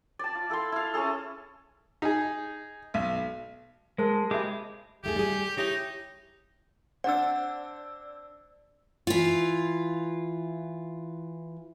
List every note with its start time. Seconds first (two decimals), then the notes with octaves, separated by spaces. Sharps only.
0.19 D5 A5
0.35 F4
0.50 E4 A4 F5 C6
0.72 E4 F5
0.94 C#4 E4 G#4 A4
2.02 D#4 G#4
2.94 B1
3.98 G#3 A#4 C5 A5
4.31 G4 G#4 D#5 E5 B5 D6
5.04 D#2 A3 G4 G#4
5.16 G3 G#4
5.57 D#4 E4 G4 C#5
7.04 C4 D4 D5 F#5 E6
9.07 E3 F4